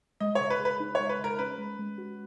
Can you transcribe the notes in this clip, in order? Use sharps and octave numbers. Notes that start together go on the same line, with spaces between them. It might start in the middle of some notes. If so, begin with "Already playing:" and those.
G#3 D#5
C#5
C#3
B4
G#4
B4
D#4
G#3 C#5
B4
C#3 A#4
C#4 B4
G#3
G#3
F#4